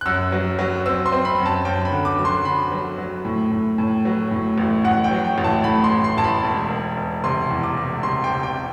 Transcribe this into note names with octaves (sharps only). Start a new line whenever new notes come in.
F#6
F#2 E6
F#3
F#3
C4 E6
C6
C4
B5
F#2
A5
F#2 G5
B5
D3
D6
F#3
C6
D3 B5
F#3
F#3
A2
A2
A2
F#3
A2
A1
A1 F#5
G5
F#3
G5
A1
A5
A2 B5
C6
A1
C6
A1 A5
B5
E1
E1
E1
C3 C6
E2
D6
E1
C3 C6
G5
C3
G5